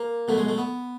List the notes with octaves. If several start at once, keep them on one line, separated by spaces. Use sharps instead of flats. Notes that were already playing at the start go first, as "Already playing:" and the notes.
Already playing: A#3
B2 F#3 A3
G#3
A3
B3